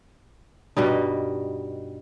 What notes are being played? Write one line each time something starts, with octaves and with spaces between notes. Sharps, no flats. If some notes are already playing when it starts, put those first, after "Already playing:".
G2 B2 G3 D#4